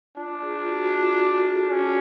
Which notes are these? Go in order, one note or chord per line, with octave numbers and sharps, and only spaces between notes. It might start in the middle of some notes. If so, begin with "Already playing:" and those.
D4 F4
G#4
F4
F#4
F#4
F4
F4
F#4
A4
G#4
C#4